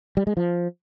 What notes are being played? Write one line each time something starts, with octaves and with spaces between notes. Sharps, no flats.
G3
G#3
F3